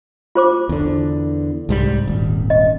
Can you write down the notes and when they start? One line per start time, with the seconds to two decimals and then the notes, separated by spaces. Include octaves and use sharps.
0.35 F4 C5 D6
0.69 E2 D3
1.69 C2 G#2 G3
2.07 D#1 G#1
2.50 D#5